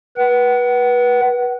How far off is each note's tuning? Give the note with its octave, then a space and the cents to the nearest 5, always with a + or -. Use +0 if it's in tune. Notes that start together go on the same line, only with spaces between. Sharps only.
B4 -25 F#5 +30